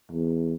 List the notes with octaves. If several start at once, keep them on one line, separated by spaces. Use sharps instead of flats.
E2